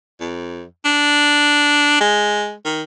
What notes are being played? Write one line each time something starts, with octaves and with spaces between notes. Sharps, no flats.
F2
D4
G#3
D#3